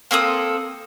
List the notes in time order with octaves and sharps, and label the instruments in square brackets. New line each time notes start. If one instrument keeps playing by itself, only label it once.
[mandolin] A#3 C4 A4 D#6